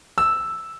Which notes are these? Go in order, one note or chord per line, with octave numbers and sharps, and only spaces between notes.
E6